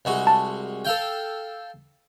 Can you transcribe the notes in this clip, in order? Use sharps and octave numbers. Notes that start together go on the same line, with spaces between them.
C2 G#3 F#4
A5
A4 F5 G5